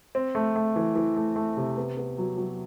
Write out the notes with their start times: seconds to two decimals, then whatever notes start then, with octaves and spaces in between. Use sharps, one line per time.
0.15 C4
0.35 A3
0.56 A3
0.76 E3
0.96 E3
1.16 A3
1.36 A3
1.57 C3
1.77 B3
1.97 B3
2.18 F#3
2.38 F#3